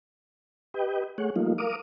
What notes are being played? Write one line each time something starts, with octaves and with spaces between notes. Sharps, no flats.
G4 B4 D#5 G5
A3 G#4 C#5 F#5
F3 G3 A3 A#3 D#4 F4
A#4 F5 D6 D#6